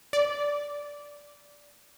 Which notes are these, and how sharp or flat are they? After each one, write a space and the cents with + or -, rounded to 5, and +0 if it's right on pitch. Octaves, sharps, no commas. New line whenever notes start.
D5 -10